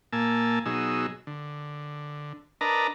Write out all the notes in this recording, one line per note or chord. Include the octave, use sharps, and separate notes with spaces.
A#2 A#3 G#5 A5 E6
B2 F#3 D#4 G#4 E6
D3
D4 A#4 B4 D#5 A5 A#5